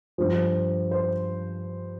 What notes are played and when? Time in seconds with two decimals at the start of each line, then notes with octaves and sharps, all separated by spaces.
0.18 G2 F3
0.91 C5